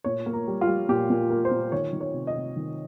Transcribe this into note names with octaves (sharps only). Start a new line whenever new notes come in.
A#2 C#5
A#3
A#4
G3
F4
G3
A#2 G4
A#2
A#3
C5
A#2
D#3 C#5
D#3
C#5
C3
D#5
C3
D#3